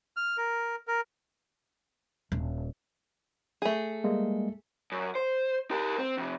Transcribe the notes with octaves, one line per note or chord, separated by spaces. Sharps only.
F6
A#4
A#4
D#1
A3 G#4
G3 G#3 A#3
F#2
C5
G4 A#4
C4
F2 C3